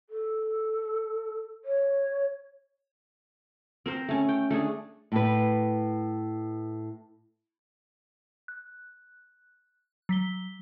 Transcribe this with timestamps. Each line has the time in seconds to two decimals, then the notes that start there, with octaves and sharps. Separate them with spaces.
0.09 A4
1.65 C#5
3.86 C4 A#4 C5
4.08 A3 C#4
4.29 G5
4.50 A3 D4 G#4
5.12 A2 B4
8.48 F#6
10.09 F#3 B6 G7